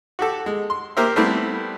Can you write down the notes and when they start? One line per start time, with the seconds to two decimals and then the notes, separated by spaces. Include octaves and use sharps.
0.19 F#4 G4 A4
0.46 G#3
0.70 C6
0.97 A#3 G4 A#4 C5 E5
1.16 G3 A3 B3 C4 E4